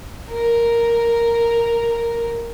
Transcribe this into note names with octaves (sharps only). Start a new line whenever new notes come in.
A#4